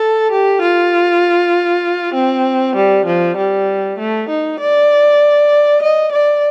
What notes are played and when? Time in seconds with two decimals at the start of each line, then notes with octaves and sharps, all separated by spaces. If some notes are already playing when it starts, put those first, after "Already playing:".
Already playing: A4
0.31 G4
0.62 F4
2.14 C4
2.76 G3
3.06 F3
3.37 G3
3.99 A3
4.29 D#4
4.60 D5
5.82 D#5
6.12 D5